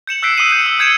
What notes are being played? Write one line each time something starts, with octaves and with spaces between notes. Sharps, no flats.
G6 C#7 E7 F#7
E6 F#6 G6 B6 C7 D7
D#6 E6 C7 D#7 F#7
G6 C#7 D#7
E6
D#6 G6 G#6 C#7 D7 E7